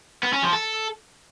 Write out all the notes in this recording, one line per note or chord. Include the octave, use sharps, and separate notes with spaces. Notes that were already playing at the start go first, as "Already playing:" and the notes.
B3
C#4
F3
A4